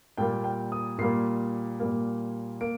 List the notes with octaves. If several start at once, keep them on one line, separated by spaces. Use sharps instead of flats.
A#2 G3 A#3 G5
G5
D#6
A#2 G3 A#3 C7
A#2 G3 A#3
A#3 D7